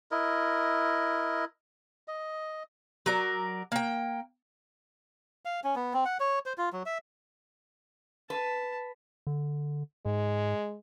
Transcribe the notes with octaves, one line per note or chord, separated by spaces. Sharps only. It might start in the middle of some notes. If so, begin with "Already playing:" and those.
E4 A#4 D#5
D#5
F#3 A#4 D5
A#3 G5
F5
C#4
B3
C4
F#5
C#5
C5
F4
F#3
E5
B4 A5
D3
G#2 G#3